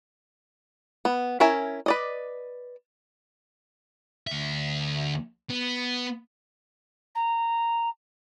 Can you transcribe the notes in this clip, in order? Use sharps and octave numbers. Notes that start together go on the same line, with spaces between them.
B3
C#4 E4 A#4 E5 G#5
B4 D5 D#5
D2 E5
B3
A#5